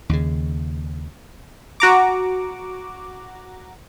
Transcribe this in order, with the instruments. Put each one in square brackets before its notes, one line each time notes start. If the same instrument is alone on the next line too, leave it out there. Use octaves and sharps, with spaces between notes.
[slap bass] D#2 C#3
[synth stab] F#4 A#5 D6